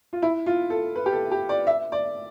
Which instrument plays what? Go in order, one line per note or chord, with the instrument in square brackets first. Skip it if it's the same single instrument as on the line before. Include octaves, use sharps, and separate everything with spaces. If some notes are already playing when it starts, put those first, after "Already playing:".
[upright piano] F4
E4
F4
A4
B4
G4
A4
G4
D5
E5
D5